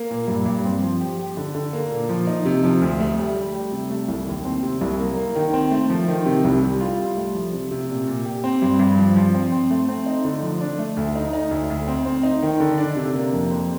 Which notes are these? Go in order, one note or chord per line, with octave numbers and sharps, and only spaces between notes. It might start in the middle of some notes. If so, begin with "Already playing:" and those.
Already playing: A#3
A#2
G2
G2
C4
F3
G4
G4
D3
D3
A#3
A#2
F3
D#4
C3
F3
D2
A3
G3
G3
G3
C3
A3
C2
D#2
C4
C3
C2
A#3
A#3
D#3
C4
A3
F3
D#3
C3
C2
G3
F4
G3
A3
F3
C3
C3
A#2
A#2
G4
C4
G2
G2
F3
F3
C4
C4
A3
C4
D#4
D3
F3
D4
A3
D2
D#4
D#4
D2
D2
C4
C4
D#4
D#3
D3
D4
C3
A#3
F2
C4